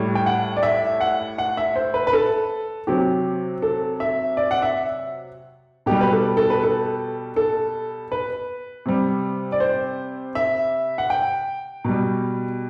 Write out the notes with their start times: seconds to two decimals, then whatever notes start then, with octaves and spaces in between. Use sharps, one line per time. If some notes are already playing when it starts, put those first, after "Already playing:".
Already playing: A2 G3
0.15 G5
0.26 F#5
0.56 D5
0.63 E5
1.01 F#5
1.38 F#5
1.57 E5
1.76 C5
1.94 B4
2.07 B4
2.13 A4
2.87 C3 F#3 G4
3.62 A4
4.00 E5
4.37 D5
4.51 F#5
4.62 E5
5.86 B2 G3 G4
6.01 B4
6.12 A4
6.37 A4
6.50 B4
6.63 A4
7.36 A4
8.12 B4
8.86 C3 G3
9.52 D5
9.60 C5
10.35 E5
10.98 F#5
11.10 G5
11.84 B2 G3